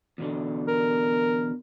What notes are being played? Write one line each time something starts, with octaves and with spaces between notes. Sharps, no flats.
E2 B2 D3
A#4